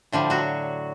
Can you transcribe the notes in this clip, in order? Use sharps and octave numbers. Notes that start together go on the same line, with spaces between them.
A2 D3 F3 G3
F#3 F#4